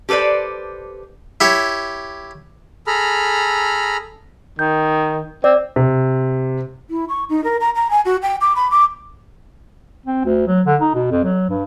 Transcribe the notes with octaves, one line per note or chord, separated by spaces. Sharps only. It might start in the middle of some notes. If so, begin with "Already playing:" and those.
G4 A4 B4 C5 D5
E4 G4 C#5
G#4 A4 A#5 B5 F6
D#3 G6
C4 D5
C3
E4
C#6
D#4
A#4
A#5
A#5
G#5
F#4
G5
D6
B5
D6
C4
D2
F#3
D3
D#4
B2
F2
F#3
G2